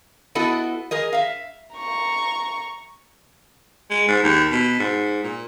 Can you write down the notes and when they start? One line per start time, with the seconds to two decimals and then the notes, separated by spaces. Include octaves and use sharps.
0.35 B3 E4 F#4 A4 D#5
0.91 G#4 A#4 D#5
1.13 E5 F5
1.75 A#5 C#6
3.90 G#3
4.08 G#2
4.23 D#2
4.51 B2
4.79 G#2
5.23 A#2